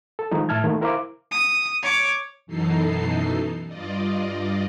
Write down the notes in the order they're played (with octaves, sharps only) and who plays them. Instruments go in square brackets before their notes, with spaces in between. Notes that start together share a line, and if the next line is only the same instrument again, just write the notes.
[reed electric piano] A4
D#3 F3 G#3 D#4
A2 E5 A5 F6 G#6
D#3 A3 A#3
E4 A#4 C5 E5 F5 D6
[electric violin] D#6
C#5 D6
[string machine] F#2 B2 E3 D#4 A4 C7
G2 F4 D5 D#5